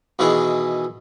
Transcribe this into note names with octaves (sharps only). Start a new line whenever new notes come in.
B2 D#3 E3 E4 G#4